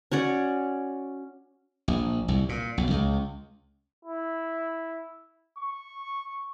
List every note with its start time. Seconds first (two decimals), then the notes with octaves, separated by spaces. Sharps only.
0.12 C#4 F#4 C#5 D5
1.88 A#1
2.28 C2
2.49 A#2
2.78 B1
2.91 C#2
4.05 E4
5.58 C#6